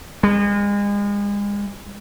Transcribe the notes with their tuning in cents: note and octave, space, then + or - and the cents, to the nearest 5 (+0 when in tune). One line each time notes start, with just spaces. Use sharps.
G#3 -35